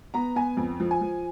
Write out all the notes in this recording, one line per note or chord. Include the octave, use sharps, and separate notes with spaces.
B3 A#5
B3 G#5
F2
F3
G#5
F3